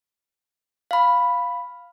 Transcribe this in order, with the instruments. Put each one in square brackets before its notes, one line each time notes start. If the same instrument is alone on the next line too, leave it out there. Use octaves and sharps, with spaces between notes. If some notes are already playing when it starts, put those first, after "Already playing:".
[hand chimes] F5 B5